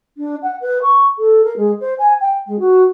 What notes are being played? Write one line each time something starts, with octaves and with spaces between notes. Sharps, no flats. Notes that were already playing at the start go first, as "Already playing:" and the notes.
D4
F#5
B4
C#6
A4
A#4
G#3
C5
G#5
G5
G#3
F#4